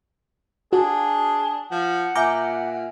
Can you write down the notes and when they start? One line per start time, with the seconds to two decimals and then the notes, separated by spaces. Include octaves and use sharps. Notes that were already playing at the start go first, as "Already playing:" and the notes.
0.73 D4 F#4 G#4
1.71 F3 F#5
2.15 A#2 E5 G#5 A#5 D6 F6 G6